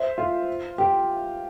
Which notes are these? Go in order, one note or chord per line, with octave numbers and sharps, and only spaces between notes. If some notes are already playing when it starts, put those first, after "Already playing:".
Already playing: C5 E5
F4
G4